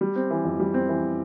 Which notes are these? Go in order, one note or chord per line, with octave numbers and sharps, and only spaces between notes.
G3
C4
E3
F2
G3
C4
E3